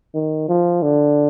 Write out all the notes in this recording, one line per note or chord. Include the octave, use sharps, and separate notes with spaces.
D#3
F3
D3